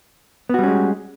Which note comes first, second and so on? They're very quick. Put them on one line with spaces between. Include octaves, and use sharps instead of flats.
B3 F#4 G3 C#4 G#3